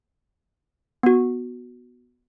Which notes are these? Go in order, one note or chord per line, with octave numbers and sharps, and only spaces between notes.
B3 F#4